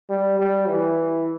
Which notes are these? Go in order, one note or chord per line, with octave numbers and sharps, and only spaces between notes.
G3
G3
E3